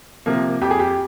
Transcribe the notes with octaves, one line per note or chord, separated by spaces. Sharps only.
C3 F3 A#3
F2 G4
G#4
G4